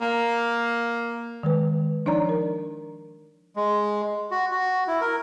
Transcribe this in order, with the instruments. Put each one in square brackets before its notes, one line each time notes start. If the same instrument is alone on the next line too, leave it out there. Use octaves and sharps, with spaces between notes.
[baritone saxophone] A#3
[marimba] D#3 G#3 B4
F3 D4 D#4 C#5 D5 A#5
A#4
[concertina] G#3
F#4
F#4
E4
A#4